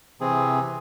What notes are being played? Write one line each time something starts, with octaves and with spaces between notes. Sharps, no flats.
C3 E3 C4 G#4